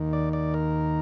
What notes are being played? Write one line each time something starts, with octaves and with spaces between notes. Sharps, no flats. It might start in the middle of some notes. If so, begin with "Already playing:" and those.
Already playing: D#2 D#3
D5
D5
A#4